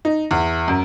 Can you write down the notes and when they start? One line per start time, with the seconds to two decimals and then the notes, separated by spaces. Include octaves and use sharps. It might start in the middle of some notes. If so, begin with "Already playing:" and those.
0.05 D#4
0.31 E2
0.68 F#2